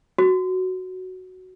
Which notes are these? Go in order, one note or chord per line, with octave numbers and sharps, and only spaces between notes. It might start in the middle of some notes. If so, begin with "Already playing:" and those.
F#4